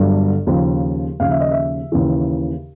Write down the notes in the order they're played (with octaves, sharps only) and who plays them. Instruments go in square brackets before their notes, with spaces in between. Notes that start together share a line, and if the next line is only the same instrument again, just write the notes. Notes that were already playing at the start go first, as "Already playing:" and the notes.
Already playing: [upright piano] G1 G2 D3 F#3
D#2 C#3 F3
D#2 C#3 F3 F5
E5
D#5
E5
D#2 C#3 E3